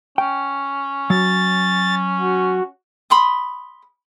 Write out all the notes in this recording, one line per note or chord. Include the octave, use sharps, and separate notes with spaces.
C#4 G5
F#3 A6
F#4
B5 C6 D#6